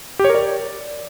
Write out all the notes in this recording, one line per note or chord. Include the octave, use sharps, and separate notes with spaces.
G4
C#5
A#4
D5